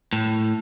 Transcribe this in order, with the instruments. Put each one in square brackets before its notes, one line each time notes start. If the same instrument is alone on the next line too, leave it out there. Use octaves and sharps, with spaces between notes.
[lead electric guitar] A2